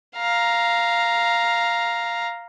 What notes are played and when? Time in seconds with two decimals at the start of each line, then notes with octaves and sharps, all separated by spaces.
0.16 F5 A#5